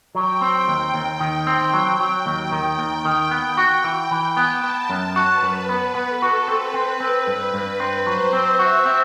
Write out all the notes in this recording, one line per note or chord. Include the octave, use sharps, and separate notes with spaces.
F#3 G5
C4
D#2
D#2
D#3
C4
F#3 G5
F#3
D#2
D#3 G5
D#2
D#3
B3
F#4
E3
E3 G5
B3
A5
B3
F#2 A5
F#4
B4
F#2
B3 B4
B3
A4
F#4
C4 B4
C4
C4
G2
G2
C4
F#3 C5
C4
E5
F#4
C4